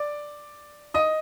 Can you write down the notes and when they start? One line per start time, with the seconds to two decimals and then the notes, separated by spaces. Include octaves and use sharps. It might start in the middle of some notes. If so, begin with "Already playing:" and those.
Already playing: D5 D6
0.94 D#5 D#6